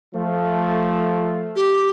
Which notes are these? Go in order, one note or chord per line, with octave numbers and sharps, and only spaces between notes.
F3 A3
G4